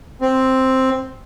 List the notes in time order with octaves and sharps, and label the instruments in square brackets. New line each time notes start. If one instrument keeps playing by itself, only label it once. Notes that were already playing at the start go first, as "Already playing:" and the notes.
[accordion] C4